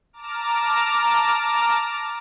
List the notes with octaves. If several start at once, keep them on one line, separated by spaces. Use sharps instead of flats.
A5 A#5 D6 F6